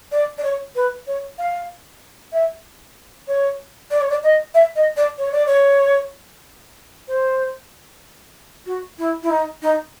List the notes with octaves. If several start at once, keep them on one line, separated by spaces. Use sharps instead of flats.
D5
D5
C#5
B4
C#5
F5
E5
C#5
D5
C#5
D5
D#5
E5
D#5
D5
C#5
D5
C#5
C5
F#4
E4
E4
D#4
D#4